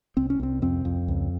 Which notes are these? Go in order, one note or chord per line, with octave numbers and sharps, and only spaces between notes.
C2 C4
C#4
C2 C4
F2 C4
F2
C#2